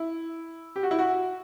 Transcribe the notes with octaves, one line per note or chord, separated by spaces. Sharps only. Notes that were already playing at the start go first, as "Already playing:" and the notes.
Already playing: E4
G4
F#4
E4
F#4